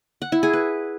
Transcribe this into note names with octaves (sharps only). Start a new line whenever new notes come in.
F#5
E4
G#4
B4